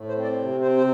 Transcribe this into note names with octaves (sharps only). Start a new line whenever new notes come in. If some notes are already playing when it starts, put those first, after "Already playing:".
Already playing: A2
C5
C4
D5
C3
C4 C5
C5